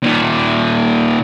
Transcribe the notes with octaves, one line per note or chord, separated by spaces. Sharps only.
A#2 D#3